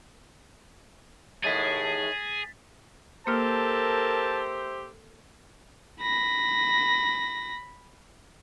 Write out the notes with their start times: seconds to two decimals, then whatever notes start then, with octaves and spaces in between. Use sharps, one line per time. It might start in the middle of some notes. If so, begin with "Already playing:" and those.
1.44 D#2 A2 G#3 G#4 A6 B6
3.27 A#3 G4 A4 A#4 C5 E5 A5 F6
6.01 B5 A#6